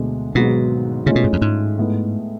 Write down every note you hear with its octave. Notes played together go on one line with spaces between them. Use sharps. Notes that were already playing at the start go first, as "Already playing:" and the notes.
Already playing: D2 B2 D3 G#3 D4
G#1 G#2 B2 F#3 B3 F#4
A2 C#3 G#3 C#4 F4
B2
G#2
F2
G#2
A2 G#3 B3